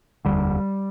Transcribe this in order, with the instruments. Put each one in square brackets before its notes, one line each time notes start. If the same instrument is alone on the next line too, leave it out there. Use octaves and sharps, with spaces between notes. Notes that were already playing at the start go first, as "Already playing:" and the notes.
[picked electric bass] F1 D#2 D3 G3